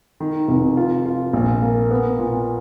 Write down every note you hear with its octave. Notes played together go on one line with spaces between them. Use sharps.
D#3
F1
F4
F4
A#1
A#3
B3
A#2